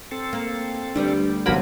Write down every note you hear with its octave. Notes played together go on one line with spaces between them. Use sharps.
C4 A4
A#3
D2 G3 B3 D4
G1 C3 D#3 F#3 A#3 B3 A#4 B5